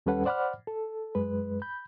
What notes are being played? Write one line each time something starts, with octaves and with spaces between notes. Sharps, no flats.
D#2 G3 C#4 A4 B4 F#5
C5 D5 F#5 B5 D6 F6
A4
F#2 G#3 B4
B5 G6